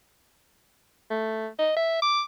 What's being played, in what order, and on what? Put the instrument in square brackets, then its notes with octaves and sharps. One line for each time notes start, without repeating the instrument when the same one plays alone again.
[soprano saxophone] A3
D#5
E5
D6